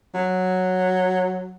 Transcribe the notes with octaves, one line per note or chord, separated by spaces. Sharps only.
F#3